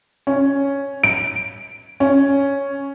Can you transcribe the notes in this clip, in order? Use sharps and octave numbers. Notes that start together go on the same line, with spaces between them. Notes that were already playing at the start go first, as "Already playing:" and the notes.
C#4
D7
C#4